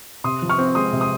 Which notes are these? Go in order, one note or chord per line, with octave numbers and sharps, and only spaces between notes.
C3 C6 D#6
F3
C#6 F6
C4
G#3 C6 D#6
C3
C6 D#6